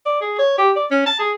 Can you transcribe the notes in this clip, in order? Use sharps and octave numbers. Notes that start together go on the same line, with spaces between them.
D5
G#4
C#5
G4
D5
C#4
A5
G#4